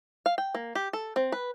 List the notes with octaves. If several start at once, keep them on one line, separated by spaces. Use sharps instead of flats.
F5
G5
A#3
G4
A4
C4
B4